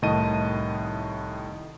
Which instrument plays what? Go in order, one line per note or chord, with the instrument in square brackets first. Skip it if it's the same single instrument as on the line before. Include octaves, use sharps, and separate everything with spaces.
[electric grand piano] C2 A2 D#3 D#5 A5 D#7